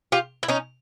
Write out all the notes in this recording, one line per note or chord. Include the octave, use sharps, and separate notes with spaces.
F4 G4
E4
C#4 D#4